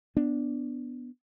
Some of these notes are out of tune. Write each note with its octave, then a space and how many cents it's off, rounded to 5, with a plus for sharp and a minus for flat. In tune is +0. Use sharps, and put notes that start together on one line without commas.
B3 +0 D4 +0